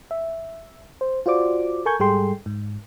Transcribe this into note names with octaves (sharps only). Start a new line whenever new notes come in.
E5
C5
F4 F#4 C5 D5 D6
A4 A#4 G#5 C#6 G6 G#6
G#2 G3 G#4 A4 G5 C6
G#2